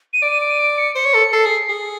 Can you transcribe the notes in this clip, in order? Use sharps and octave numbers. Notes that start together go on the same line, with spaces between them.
D#7
D5 D7
D#7
D7
D#7
D7
C#7
C5 C#7
C#5
A4
A4 C7
G#4
G#4